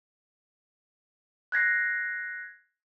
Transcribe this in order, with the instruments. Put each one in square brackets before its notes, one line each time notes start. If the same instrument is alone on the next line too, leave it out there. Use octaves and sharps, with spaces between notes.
[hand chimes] F#6 G#6 A#6 C7